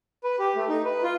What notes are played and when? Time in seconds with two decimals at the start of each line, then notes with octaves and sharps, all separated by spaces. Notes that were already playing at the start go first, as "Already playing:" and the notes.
0.24 B4
0.39 G4
0.56 A3
0.69 D#4
0.85 B4
1.03 F4